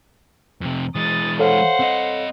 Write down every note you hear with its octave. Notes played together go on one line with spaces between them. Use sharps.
F2 C3
E3 G#3 D#6 A6
A4 C5 C#5 F5 F#5
C4 D#5